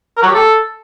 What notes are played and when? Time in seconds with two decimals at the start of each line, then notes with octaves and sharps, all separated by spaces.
0.17 A#4
0.22 F#3
0.28 G4
0.34 A4